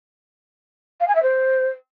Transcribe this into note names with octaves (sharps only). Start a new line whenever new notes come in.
F5
G#5
E5
C5